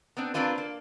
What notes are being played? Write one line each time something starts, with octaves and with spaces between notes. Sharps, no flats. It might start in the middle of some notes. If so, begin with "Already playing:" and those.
B3 C4 D4
A#3 C4 D4 F4 B4
A#3